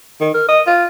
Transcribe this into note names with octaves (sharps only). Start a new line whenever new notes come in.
D#3
A#4
D#5
F4